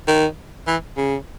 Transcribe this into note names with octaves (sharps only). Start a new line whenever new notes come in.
D#3
E3
C#3